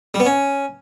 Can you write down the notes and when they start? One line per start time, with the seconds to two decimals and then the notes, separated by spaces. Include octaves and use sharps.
0.14 G3
0.20 B3
0.25 C#4